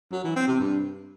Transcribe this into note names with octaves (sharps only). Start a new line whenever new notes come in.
F#3
E3
C4
C3
G2